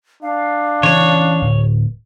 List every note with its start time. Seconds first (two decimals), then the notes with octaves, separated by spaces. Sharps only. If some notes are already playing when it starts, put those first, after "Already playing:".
0.23 D4 F5
0.83 C#3 E3 C#4 C#5
1.42 D1